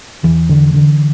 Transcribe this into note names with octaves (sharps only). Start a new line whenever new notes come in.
E2 E3
D3
D3